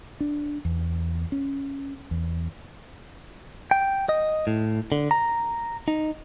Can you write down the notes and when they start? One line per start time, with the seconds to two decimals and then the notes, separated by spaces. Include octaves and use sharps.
0.20 D4
0.65 E2
1.32 C#4
2.11 E2
3.71 G5
4.09 D#5
4.47 A2
4.92 D3
5.11 A#5
5.88 D#4